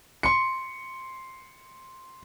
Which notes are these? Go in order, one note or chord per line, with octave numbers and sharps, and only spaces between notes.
C6 C#7